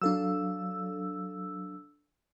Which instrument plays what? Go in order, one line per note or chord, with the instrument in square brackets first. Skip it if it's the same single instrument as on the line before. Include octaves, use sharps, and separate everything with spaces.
[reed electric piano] F#3 F5 [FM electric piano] D4 A4 E6